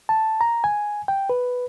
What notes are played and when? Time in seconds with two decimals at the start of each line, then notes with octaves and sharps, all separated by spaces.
0.09 A5
0.41 A#5
0.64 G#5
1.08 G5
1.29 B4